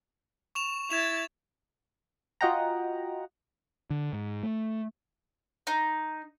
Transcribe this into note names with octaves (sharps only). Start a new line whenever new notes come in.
C#6 E7 F7
E4 G#6 A6 E7 F7
F4 F#4 D#5 F#5 G5 A#5
D3
G#2
A3
D#4